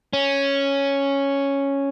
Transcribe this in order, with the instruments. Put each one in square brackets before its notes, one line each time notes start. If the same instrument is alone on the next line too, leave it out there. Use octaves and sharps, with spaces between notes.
[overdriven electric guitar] C#4